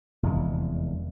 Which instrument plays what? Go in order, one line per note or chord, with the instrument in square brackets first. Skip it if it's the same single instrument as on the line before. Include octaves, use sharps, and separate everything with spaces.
[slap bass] F1 E2 D3 G#3